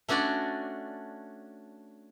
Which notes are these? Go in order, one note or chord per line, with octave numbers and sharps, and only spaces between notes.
A3 C#4 D4 F#4 D5